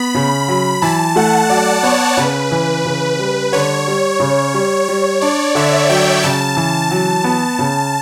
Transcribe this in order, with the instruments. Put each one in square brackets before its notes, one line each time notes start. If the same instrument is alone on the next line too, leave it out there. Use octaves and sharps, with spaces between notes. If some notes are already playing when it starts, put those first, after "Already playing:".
Already playing: [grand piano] B3 [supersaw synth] B5
[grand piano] C#3
F#3
[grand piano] E3 [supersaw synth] A5
[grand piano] A3 [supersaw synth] F#5
[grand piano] F#3 [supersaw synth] D5
[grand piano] B3 [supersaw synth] C#5
[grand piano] C#3 [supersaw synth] B4
[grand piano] E3
C#3
G3
[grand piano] D3 [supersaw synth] C#5
[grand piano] G3
C#3
G3
[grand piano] G3 [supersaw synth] C#5
[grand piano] D4 [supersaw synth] D5
[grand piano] D3 [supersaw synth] E5
[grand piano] F#3 [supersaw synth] G5
[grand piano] C#3 [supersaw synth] A5
[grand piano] E3
[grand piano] F#3 [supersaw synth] A5
[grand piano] B3
C#3